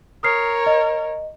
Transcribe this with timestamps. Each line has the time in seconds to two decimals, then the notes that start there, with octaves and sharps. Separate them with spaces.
0.23 A#4 C#5 D#6 F6 C7
0.67 D#5